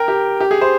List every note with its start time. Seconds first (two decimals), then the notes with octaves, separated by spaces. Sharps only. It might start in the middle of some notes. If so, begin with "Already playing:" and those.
Already playing: A#4 G5
0.08 G4
0.40 G4
0.51 G#4
0.61 C5